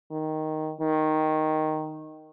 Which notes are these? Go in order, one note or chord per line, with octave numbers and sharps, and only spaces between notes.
D#3
D#3